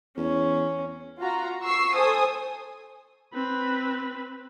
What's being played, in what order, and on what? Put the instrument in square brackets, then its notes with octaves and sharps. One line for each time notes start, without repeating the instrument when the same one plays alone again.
[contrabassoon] E2 [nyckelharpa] C#4
[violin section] F4 F#4 A#5
C#6 E6 C7
A4 C5 G#5 D#6
[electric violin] C4 B4